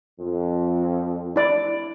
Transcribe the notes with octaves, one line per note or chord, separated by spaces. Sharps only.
F2
E4 D5